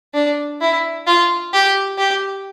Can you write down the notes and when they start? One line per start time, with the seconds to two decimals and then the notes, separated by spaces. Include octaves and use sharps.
0.14 D4
0.61 E4
1.06 F4
1.53 G4
1.98 G4